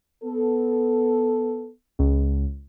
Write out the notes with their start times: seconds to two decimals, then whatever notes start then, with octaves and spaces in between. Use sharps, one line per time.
0.24 B3 A4
1.99 C#2